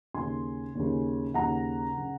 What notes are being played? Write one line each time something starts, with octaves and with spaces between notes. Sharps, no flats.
D#2 C#3 G#5 C6
D#2 C#3
D#2 C#3 F#5 A#5
C#3